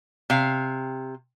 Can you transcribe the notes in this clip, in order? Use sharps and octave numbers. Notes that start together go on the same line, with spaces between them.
C3 F5